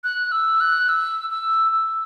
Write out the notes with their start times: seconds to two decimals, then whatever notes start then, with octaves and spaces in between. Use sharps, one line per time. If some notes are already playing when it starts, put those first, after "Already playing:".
0.04 F#6
0.32 E6
0.60 F#6
0.89 E6
1.30 E6
1.72 E6